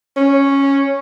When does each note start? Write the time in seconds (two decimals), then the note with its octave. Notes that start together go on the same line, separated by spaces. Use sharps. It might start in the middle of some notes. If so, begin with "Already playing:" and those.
0.17 C#4